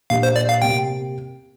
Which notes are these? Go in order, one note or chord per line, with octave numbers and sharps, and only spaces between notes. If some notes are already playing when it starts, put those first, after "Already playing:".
A#2 A#3 D4 G4 F5
C5
D5
F5
C3 A#3 G4 G5